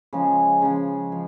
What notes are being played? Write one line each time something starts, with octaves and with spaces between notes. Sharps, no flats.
C#3 F3 G#3
C#3 F3 G#3
F3